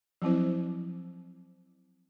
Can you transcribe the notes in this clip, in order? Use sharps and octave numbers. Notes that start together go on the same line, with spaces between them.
F3 F#3 C4 E4 C5